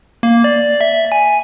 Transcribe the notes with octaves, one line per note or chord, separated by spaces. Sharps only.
A#3
D5
E5
G#5